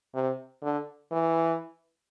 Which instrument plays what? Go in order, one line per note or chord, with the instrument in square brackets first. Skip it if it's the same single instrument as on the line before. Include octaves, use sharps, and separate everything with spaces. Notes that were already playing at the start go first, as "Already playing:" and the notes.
[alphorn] C3
D3
E3